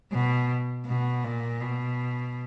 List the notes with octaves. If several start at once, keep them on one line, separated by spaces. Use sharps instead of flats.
B2
B2
A#2
B2